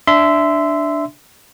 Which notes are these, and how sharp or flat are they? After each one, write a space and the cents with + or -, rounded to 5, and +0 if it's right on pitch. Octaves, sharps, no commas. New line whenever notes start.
D4 +0 E5 +0 C6 -25